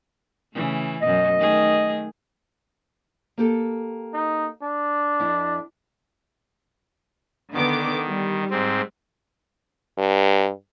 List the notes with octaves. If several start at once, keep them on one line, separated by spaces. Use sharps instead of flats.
C#3 E3 A3
F#2 B2 D#5
D#3 A3 G#4
A#3 G4 A4
D#4
D4
F2 E4
D3 D#3 B3 D6
G3
G#2 C4
G2